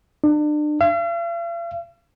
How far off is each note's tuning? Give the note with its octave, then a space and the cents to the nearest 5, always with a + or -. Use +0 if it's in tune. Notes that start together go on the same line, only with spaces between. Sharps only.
D4 +35
F5 -45